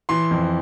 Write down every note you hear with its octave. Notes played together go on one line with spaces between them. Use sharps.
E3 C6
F2